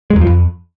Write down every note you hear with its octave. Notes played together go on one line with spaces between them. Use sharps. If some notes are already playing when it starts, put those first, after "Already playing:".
G#3
E2
F3
F2